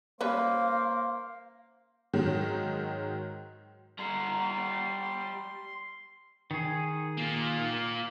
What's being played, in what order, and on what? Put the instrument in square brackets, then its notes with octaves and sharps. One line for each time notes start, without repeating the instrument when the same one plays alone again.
[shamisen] G3 C#4 B4 [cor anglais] A#3 [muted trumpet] C5 [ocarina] F5
[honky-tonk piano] G#2 D#3 F#3
[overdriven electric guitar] G3 A#5 [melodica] C6
[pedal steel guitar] D#3 G#4
[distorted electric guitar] A#3 F4